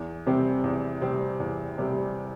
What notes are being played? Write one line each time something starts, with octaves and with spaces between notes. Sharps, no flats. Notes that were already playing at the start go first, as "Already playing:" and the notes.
Already playing: E2
C3 G3 C4 G4
E2
C3 G3 C4 G4
E2
C3 G3 C4 G4